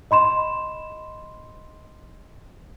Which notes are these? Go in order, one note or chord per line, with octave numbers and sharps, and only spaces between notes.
D#5 B5 C6 E7